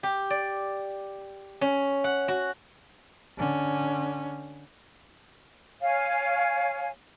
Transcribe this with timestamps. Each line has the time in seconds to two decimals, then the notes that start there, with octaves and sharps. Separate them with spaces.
0.03 G4
0.30 D5
1.61 C#4
2.04 F#5
2.28 F#4
3.37 D3 C#4
5.81 C#5 F5 G#5